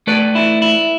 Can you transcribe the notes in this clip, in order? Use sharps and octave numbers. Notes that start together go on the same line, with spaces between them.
A3 B4 D5
E4
E4